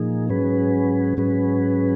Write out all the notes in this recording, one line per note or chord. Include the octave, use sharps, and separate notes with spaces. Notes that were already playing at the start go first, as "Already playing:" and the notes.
Already playing: A#2 F3 A#3 D#4 G#4
G#2 F#3 C#4 G#4 B4
G#2 F#3 C#4 G#4 B4